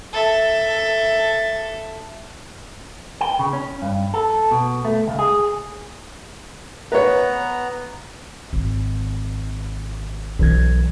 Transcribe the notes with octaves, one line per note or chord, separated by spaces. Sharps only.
A4 E5
G5
C#3
C#4
G2
A4
B2
A3
C#2
G#4
B3 B4 C#5 A#5
G#1 D#3
B1 E3 G#6